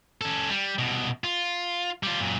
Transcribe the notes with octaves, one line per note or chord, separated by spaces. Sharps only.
C#4 A4
G3
C2 B2
F4
G3 F4
F#2 A#2